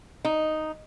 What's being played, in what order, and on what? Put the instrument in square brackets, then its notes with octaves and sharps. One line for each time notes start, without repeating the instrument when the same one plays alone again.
[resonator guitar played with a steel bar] D#4